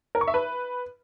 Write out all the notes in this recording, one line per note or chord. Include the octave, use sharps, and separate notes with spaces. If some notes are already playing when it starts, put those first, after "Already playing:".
A#4
C#6
E5
B4